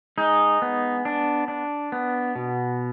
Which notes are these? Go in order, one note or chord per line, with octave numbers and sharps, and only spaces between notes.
G#3 D#4
B3
D4
D4
B3
B2